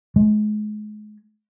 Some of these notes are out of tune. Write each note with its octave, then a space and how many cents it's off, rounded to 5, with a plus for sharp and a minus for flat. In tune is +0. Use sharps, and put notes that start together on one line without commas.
G#3 +35